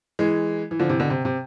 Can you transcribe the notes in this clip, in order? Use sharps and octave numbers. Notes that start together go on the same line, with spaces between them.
E3 G#3
E3
D3 F3
C3 E3
B2 D3
C3
C3